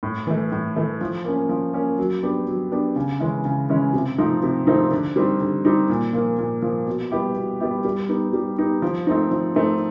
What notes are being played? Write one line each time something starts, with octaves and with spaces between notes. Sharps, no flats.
A2
E3 A3
A2
E3 A3
F3
A#3 C#4
F3
A#3 C#4
F#3
B3 D4 G4
F#3
B3 D4 G4
C#3
E3 G#3 C#4 E4
C#3
E3 G#3 C#4 E4
C3
F3 A3 C4 D#4
C3
F3 A3 C4 D#4
D3
G3 C4 D#4
D3
G3 C4 D#4
A#2
F3 A#3
A#2
F3 A#3
B2
G3 B3 E4 G4
B2
G3 B3 E4 G4
G3
B3 D#4 G4
G3
B3 D#4 G4
F3
A3 C4 D#4
F3
A3 C4 D#4